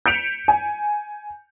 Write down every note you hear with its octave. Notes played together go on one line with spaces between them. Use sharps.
G6 B6 C#7 D7 E7 F7
G#5